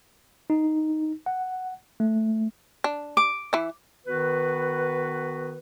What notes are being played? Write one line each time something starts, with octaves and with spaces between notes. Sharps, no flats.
D#4
F#5
A3
D4
D6
E3 E4
D#3 B3 F#4 B4